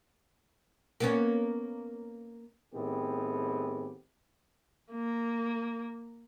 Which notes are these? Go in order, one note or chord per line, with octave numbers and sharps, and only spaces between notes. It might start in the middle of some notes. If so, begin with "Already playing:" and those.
A#3 B3 C#4
A2 D#3 B3 C4 G4 G#4
A#3